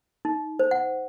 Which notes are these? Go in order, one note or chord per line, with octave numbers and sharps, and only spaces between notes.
D#4
C5
F#5